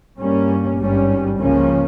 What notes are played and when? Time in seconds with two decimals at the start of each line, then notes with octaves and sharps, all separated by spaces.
0.18 G2 G3 A#3 C#4
0.78 G#1 G2 G3 C#4
1.39 C#2 C#3 F3 A#3 C#4